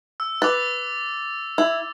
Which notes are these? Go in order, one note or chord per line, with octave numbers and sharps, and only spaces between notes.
E6
B4 D6 A6
E4